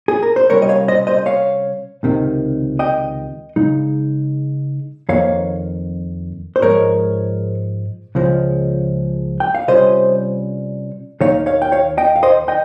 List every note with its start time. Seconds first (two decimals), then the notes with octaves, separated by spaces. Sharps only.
0.08 G#4
0.23 A#4
0.36 C5
0.50 C3 G3 C#4 A#4 C#5
0.62 D#5
0.69 C#5 F5
0.88 C5 D#5
1.07 C5 D#5
1.18 D#5
1.26 C#5 F5
2.03 C#2 C3 D#3
2.79 D#5 G5
3.56 C#3 G#3 D#4
5.09 F2 D#3 A#3 C#5 F5
6.56 C5
6.62 G#2 F3 G#3 A#4 C#5
8.15 C#2 C#3 F3 G#3
9.40 G5
9.55 F5
9.68 C3 G3 C#4 F4 C5 D#5
11.21 D#2 D#3 A#3 D#4 C#5 F5
11.46 C#5 F5
11.62 G5
11.72 C#5 F5
11.98 D#5 G5
12.16 F5
12.23 C5 D#5
12.48 D#5 G5